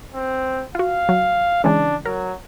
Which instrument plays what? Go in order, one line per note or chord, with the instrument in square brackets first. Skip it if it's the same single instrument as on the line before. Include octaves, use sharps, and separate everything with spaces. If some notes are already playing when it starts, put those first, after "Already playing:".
[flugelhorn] C4
[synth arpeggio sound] F4 F#4 [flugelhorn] F5
[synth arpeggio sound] F#3
[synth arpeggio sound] C#3 E3 G#3 [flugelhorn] D4
[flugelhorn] F#3 [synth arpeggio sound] A#4